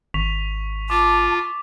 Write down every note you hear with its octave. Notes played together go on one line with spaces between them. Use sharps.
G#1 C#6 B6 F7
F4 A5 D6